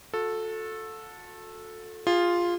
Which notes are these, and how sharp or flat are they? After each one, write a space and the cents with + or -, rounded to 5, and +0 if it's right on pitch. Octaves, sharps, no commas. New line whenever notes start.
F#4 -40 A4 +0
F4 +0 G#4 -30